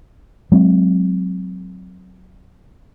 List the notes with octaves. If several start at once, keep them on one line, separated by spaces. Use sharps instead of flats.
F#3 G#3 C4